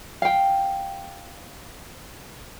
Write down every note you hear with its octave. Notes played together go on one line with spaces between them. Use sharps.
F5 G5